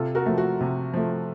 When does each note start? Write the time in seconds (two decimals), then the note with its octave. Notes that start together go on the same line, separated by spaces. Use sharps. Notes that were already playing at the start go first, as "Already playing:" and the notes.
Already playing: C3 F4 A4
0.15 F#4 A#4
0.26 F3 A3
0.38 F#4
0.61 C3
0.94 F3 A3